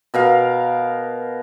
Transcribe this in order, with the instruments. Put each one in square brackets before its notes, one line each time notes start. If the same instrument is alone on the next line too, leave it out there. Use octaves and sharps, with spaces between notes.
[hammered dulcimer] B2 A#4 F5